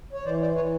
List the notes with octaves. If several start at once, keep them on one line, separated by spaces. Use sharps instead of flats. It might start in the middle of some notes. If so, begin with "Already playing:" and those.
C#5
E3 C5 D5
C5 D5
E3 B4 C#5